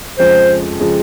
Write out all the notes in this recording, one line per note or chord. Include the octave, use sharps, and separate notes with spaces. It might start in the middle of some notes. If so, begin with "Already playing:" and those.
F2 C#3 F3 G#3 C5
C#3 F3 G#3